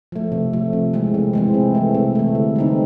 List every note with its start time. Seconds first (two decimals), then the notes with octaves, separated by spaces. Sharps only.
0.12 F3 A3
0.32 C3
0.53 F3 A3
0.73 C3
0.93 E3 G#3 C4
1.14 C3
1.33 E3 G#3 C4
1.54 C3
1.75 E3 A3
1.95 C3
2.15 E3 A3
2.35 D3
2.56 G3 C4 D#4